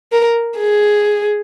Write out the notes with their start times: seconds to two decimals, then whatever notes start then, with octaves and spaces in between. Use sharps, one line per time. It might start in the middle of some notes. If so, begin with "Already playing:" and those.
0.12 A#4
0.58 G#4